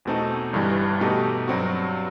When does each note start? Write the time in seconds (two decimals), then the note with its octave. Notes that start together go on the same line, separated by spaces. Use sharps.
0.05 E2 B2 A3 C4 D#4
0.53 G1 G2 E3 G3
1.00 B2 A3 D#4 G4
1.48 G2 F#3 C4 F#4